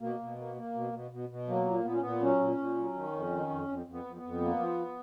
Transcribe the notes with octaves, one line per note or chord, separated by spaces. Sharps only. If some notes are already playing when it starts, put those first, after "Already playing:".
B2 A#3
B2
A#3
A#3
B2
B2
B2
B2
F#3 A#3
A#2
A#2 B3
C#4
A#2 B3
F#3 C#4
A#2
A#2
F#3
D#3
F2
D#3
F2
F2
F2
B3
F2
B3
F2
A#3
F3